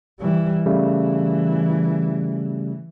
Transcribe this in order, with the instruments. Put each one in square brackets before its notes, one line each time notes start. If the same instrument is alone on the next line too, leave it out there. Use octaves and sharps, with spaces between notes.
[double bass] E3 G3
[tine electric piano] C#3 G3 A3 [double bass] E3